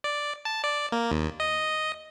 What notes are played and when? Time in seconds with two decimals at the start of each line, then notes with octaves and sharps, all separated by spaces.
0.04 D5
0.45 A5
0.64 D5
0.92 A#3
1.11 D#2
1.40 D#5